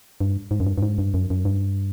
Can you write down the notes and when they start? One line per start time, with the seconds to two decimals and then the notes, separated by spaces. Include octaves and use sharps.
0.21 G2
0.51 G#2
0.60 F#2
0.67 G2
0.78 G2
0.83 G#2
0.98 G2
1.14 F#2
1.30 F#2
1.45 G2